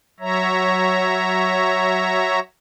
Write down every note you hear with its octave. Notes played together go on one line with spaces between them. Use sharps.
F#3 C#5 E5 A#5